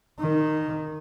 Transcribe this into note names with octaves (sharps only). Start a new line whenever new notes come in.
D#3